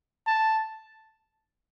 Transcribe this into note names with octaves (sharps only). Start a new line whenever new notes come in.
A5